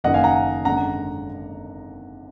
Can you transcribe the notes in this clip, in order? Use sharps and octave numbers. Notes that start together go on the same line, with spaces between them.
F#1 F#2 D#3 A#3 D#5 F#5
F5 G#5
F#5 A#5
G#1 F#2 D3 G#3 F#5 A#5